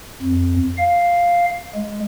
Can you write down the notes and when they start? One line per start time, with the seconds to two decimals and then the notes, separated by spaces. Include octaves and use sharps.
0.22 F2
0.77 F5
1.75 G#3